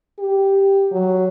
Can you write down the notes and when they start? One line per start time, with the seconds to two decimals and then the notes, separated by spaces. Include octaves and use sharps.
0.19 G4
0.92 F#3